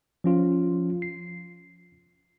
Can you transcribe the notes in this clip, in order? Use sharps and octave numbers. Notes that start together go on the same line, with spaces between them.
F3 C#4 F4
C7